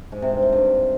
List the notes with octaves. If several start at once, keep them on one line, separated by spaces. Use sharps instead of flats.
G#2
C3
G2
C3
G2